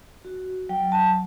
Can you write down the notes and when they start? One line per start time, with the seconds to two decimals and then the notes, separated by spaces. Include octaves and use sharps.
0.25 F#4
0.69 F#3 G5
0.92 A5